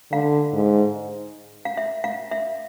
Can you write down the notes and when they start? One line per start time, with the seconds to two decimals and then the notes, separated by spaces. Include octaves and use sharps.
0.12 D3 F5
0.53 G#2
1.65 F5
1.77 E5
2.04 F5
2.32 E5